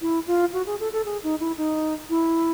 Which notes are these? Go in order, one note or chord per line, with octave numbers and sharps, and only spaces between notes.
E4
F4
F#4
G#4
A4
A4
G#4
D#4
E4
D#4
E4